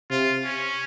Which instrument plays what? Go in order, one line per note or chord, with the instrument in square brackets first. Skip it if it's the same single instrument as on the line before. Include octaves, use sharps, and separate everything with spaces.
[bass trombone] C3 [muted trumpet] F4
[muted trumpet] C#4